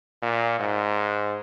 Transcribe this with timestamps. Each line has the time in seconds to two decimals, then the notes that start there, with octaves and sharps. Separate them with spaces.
0.22 A#2
0.60 G#2